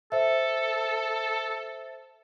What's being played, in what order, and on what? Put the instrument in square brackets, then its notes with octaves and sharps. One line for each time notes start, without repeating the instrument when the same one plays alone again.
[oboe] A4 [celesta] C5 E5